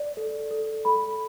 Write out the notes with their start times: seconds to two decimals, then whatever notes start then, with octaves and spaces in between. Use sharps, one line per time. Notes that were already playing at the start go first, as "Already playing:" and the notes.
Already playing: D5
0.17 A4
0.51 A4
0.85 A4 B5